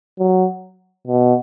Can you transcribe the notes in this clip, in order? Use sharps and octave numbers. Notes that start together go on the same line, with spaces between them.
F#3
B2